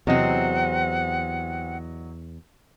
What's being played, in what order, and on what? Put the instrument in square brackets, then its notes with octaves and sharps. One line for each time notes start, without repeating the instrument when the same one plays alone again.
[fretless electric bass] E2 [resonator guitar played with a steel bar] C3 C4 [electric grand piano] F#3 D#5 [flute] F#5